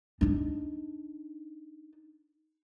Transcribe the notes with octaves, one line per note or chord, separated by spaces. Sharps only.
D4 D#4